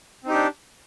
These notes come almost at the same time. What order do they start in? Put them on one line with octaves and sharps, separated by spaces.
C4 D#4 G4 D4